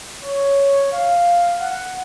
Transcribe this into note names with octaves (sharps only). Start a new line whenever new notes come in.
C#5
F5
F#5